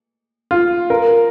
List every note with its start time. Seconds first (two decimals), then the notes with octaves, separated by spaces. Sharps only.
0.51 F4
0.90 A#4